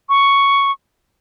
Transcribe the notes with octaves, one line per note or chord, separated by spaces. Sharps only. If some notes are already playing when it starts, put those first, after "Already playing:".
C#6